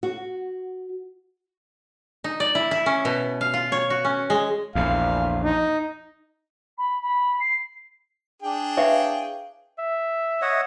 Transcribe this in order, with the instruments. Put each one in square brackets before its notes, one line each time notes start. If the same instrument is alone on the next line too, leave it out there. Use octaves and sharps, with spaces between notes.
[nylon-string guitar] F#4
[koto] D#4
D5
E4
E4
C#4
B2
F5
F4
C#5
F#4
C#4
G#3
[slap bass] A#1 E2 [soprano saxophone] F5
[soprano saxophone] D#4
[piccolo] B5
B5
C7
[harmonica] D4 G#4 G5
[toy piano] E4 B4 E5 [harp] C#5 F5
[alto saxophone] E5
[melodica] C#5 D#5 F#5